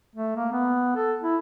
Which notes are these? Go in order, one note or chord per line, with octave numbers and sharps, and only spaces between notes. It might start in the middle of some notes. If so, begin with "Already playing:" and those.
A3
A#3
B3
A4
E4